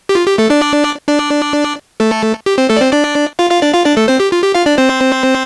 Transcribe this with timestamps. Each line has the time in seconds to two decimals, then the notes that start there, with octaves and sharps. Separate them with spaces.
0.09 G4
0.15 F4
0.27 G4
0.38 A3 A4
0.50 D4 D5
1.08 D4 D5
2.00 A3 A4
2.46 G4
2.58 C4 C5
2.69 A3 A4
2.77 D5
2.81 C4 C5
2.93 D4 D5
3.39 F4 F5
3.50 F4 F5
3.62 D4 D5
3.74 F4 F5
3.85 D4 D5
3.97 A3 A4
4.08 C4 C5
4.20 G4
4.32 F4
4.43 G4
4.55 F4 F5
4.66 D4 D5
4.78 C4 C5